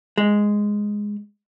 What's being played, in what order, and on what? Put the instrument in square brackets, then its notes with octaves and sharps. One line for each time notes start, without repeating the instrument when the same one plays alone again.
[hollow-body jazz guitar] G#3